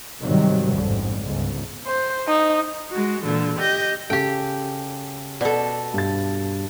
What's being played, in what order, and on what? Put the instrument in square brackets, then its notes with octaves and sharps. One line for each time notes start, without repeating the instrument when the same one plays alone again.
[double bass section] G#2 C3 D#3 F#3 G3
A1 F2 G#2 D3
G1 C#2 G#2
[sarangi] C5
D#4
[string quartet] G#3 F#4
A#2 D3 E3
G4 D#5 G6 A#6
[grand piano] C#3 A4 [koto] G4 G5
[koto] B2 A4 [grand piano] D5
[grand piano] G2 A6